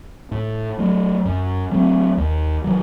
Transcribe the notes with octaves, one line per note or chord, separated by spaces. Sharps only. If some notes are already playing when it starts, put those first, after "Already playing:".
A2
F#3 A3
F#2
F#3 A3 C4
D#2
D#3 F#3